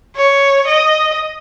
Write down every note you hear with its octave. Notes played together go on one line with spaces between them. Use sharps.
C#5
D#5